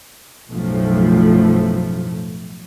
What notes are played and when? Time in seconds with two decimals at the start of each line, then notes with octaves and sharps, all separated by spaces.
0.50 B1 F#2 A2 F3 A3